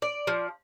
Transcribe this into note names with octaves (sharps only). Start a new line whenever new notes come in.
D5
F3